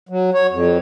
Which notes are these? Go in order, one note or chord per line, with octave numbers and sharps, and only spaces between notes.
F#3
C#5
F2